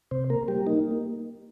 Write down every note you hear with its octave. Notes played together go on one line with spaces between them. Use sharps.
C3 C5
A#3 A#4
G3 G4
A#3 D#4